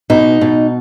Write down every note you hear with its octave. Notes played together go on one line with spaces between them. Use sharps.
B2 D#4
B2